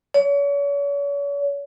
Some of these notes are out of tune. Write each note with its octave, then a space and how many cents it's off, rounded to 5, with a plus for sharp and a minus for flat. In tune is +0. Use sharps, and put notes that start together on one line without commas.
C#5 +40